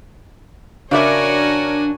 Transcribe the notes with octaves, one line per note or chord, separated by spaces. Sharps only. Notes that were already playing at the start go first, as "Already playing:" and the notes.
C#3 D4 F#4 A#4 C#5 D5 E5 G#5